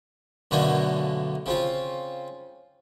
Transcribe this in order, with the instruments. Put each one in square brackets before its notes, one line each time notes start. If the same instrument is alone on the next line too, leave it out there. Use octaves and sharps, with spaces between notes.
[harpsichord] F#2 B2 D3 A3 A#3 D4
C#3 C4 F4